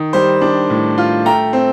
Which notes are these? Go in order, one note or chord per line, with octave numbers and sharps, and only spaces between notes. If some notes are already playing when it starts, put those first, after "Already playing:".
Already playing: D#3
G3 C5
D4
A2
F4
A3 G5 A#5
C4